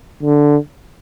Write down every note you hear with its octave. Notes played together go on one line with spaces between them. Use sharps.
D3